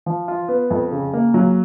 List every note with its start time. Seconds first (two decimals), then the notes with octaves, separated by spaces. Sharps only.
0.06 F3
0.28 F4
0.48 B3
0.70 F2
0.92 C#3
1.13 A#3
1.34 F#3